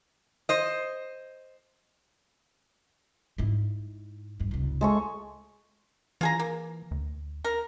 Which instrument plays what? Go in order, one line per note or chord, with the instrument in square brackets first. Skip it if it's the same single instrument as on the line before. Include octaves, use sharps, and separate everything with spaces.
[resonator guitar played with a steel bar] C5 D#5
[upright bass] G#2 E4
A#1 G2
F1 C#2
[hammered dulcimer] G#3 A4 C#6
[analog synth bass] E3 [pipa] F4 G#4 A#5
[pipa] A#3
[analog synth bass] D2
[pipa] A#4